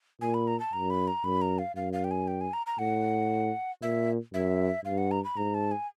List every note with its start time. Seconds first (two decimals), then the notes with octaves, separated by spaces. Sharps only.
0.21 A#2 G#5
0.34 B5
0.47 A#5
0.60 A5
0.73 F#2 A#5
0.90 B5
1.07 A#5
1.24 F#2 B5
1.41 A#5
1.58 F5
1.76 F#2 F5
1.93 F5
2.04 G5
2.11 G#5
2.28 G5
2.41 G#5
2.53 A#5
2.66 A#5
2.78 A2 F#5
3.82 A#2 E5
4.34 F#2 E5
4.85 G2 F5
4.98 F#5
5.11 A#5
5.24 B5
5.37 G#2 A#5
5.54 A5
5.71 G#5